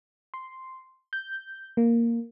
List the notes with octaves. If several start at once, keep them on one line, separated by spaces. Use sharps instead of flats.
C6
G6
A#3